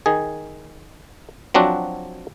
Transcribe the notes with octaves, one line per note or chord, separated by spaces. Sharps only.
D#3 G#4
F3 F#3 C4 D4 F#4